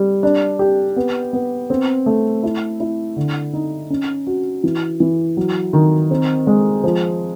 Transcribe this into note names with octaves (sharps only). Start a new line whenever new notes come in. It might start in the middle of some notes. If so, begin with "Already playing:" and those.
Already playing: G3
D4
G4
B3
B3
C4
A3
E4
E4
D3
D#4
C#4
F#4
E3
E3
F#3
D#3
C4
G#3
F3